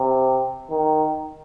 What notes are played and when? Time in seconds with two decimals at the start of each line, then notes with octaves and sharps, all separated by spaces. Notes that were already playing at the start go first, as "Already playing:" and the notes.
Already playing: C3
0.71 D#3